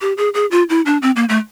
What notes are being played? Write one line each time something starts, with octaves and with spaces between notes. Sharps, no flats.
G4
G#4
G#4
F4
E4
D4
C4
A#3
A3